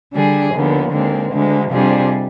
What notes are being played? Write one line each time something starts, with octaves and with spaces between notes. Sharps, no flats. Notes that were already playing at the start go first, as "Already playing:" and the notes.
D3 G3 D4 G#4
D#2 D3 F3 B3
D#2 D3 G#3 C4
D2 D3 G#3
F2 C3 G3 D4 G#4